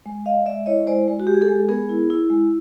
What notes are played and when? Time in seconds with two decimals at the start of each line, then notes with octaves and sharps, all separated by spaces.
0.06 G#3
0.25 G#3 D#5 F5
0.46 G#3 D5 E5
0.66 E4 C#5 D#5
0.87 G#3 C5 D5
1.08 G#3
1.20 F#4
1.27 G#3 G4
1.34 G#4
1.41 G4 A4
1.48 G#3
1.69 B3 G#4 A#4
1.89 E4
2.10 E4
2.30 G#3